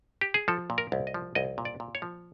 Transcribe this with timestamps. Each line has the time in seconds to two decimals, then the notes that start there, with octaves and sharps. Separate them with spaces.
0.21 G4
0.34 G#4
0.48 F3 A4
0.70 A#2
0.78 A#4
0.92 C2
1.07 D#5
1.14 F3
1.35 C2 D#5
1.58 A#2
1.65 D5
1.80 A#2
1.95 C#5
2.02 F3